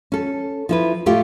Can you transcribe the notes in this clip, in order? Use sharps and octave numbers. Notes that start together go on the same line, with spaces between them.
C#4 A4
F3 E4 B4
A2 A3 F4 G4